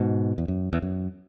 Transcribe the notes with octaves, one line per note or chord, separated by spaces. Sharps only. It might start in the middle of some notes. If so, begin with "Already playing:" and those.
Already playing: G#2 B2
E2
F#2
E2
F#2